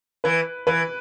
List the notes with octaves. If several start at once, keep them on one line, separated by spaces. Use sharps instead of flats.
E3 B4
E3 B4